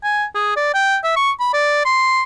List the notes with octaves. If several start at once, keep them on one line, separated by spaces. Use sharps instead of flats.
G#5
G#4
D5
G5
E5
C#6
B5
D5
C6